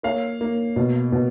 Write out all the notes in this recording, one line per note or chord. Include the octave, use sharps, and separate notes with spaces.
A#3 C#5 F5
A#3
B2
B2